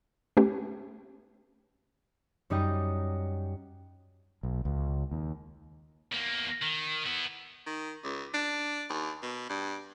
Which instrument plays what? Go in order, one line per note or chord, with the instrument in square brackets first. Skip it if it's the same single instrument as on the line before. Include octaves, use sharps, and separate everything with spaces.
[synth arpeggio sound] A3 B3 C#4 G4
[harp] F#2 G3 D#4 G4 D#5 G5
[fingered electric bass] B1
C#2
D#2
[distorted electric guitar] E2 A#3
D#3
B3 E4
[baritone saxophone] D#3
C#2
D4
D#2
B2
G2